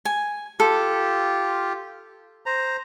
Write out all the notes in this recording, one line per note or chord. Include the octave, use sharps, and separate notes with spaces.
G#5
F4 G4 A4
C5 A#5